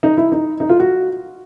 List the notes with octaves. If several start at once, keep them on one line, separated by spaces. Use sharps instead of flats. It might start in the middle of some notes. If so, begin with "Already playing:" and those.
D#4
E4
D#4
D#4
F4
F#4